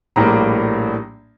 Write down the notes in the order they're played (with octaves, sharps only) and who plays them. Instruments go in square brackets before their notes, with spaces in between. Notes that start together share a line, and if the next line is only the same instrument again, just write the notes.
[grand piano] A#1 A2 G3 A#3 A#5